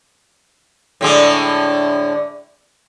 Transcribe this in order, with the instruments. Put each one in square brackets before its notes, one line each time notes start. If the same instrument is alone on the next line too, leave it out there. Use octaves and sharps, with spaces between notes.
[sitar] A2 D3 G#3